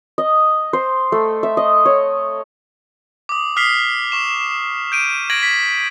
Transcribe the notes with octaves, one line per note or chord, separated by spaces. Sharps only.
D#5
C5
A3
E5
D#5
C#5
D6 D#6
D#6 F6 B6 C7 F7 G7
C#6 E7
G6 D7 D#7
G#6 A#6 D7 F#7
B6